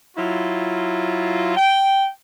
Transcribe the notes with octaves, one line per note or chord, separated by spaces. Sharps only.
F#3 E4 F4
G5